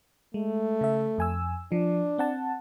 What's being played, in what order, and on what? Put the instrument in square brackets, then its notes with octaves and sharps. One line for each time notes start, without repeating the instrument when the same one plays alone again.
[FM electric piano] G#3 [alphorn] A3
[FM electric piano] C#3 E5
F2 G#5 E6
[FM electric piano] F3 [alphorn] D4
[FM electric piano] C4 F#5 A5